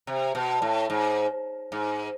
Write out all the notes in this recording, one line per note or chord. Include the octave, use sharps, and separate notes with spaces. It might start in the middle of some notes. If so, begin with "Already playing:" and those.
C3
B2
A2
G#2
G#2